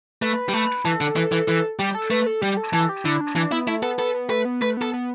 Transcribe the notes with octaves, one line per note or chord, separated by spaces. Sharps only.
A3 B4
G3
A3
E3 A4
D3
E3
E3
E3 A4
G3 G4
A4
A3 B4
A4
G3 G4
A4
E3 A4
G4
D3 E4
D4
E3 D4
B3 E4
A3 E4
B3 A4
B3 A4
B3
A3 B4
B3
A3 B4
B3 A4
B3